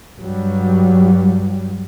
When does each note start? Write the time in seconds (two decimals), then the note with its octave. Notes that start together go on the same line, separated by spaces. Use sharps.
0.17 G2 F#3 G3